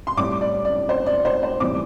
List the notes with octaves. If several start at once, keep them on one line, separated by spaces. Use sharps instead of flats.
C6
A2 G3 C4 D6
D5
D5
C5
D5
C5
C5
A2 E3 G3 C4 D6